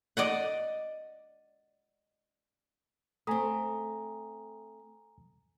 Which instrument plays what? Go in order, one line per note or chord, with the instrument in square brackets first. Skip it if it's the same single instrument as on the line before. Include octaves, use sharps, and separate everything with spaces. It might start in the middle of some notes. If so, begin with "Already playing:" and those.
[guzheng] D5 D#5 F#5
[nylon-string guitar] A3 C4 [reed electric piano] G#5 A#5 D#6